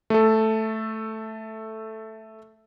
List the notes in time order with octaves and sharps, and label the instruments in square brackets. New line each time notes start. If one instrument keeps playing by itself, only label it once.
[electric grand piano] A3 A4